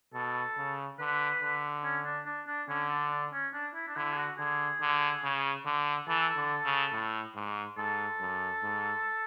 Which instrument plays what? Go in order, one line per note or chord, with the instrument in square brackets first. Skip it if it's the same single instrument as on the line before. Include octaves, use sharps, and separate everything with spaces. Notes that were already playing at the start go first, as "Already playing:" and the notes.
[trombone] B2 [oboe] A4
[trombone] C#3
[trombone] D3 [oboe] B4
[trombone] D3
[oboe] C#4
D4
D4
D4
[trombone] D3 [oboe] C#4
[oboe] D4
D4
C#4
D4
E4
D4
[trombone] D3 [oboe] E4
[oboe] G#4
F#4
[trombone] D3 [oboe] G#4
[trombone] D3
C#3
D3
[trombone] E3 [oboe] A4
[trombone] D3
C#3
A2
G#2
[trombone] G#2 [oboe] A4
[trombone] F#2
G#2